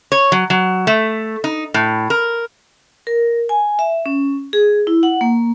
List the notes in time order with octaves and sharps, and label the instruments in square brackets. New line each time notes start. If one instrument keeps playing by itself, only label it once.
[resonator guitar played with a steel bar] C#5
F#3
F#3
A3
D#4
A2
A#4
[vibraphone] A#4
G#5
E5
C#4
G#4
E4
F#5
A#3